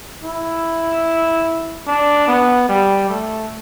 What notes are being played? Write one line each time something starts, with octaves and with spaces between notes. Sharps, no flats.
E4
D4
B3
G3
A3